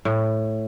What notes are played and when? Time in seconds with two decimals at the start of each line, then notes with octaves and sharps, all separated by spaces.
0.05 A2